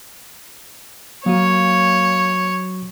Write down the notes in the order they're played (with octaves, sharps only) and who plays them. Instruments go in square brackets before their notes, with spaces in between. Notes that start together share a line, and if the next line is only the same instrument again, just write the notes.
[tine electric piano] F#3 F#4 [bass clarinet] A#3 [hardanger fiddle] C#5